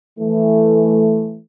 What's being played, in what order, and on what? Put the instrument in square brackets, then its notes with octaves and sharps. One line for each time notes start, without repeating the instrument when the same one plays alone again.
[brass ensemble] E3 A3